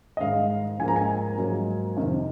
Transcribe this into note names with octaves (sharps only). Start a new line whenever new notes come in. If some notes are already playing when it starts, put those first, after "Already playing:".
D#5
G#2 D#3 G#3 F5
G#2 F3 A#3 G#5
A#5
G#5
G#2 F#3 A#3
F2 C3 D#3